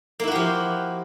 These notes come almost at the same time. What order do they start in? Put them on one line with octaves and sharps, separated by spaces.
A#3 E4 F#4 G4 F3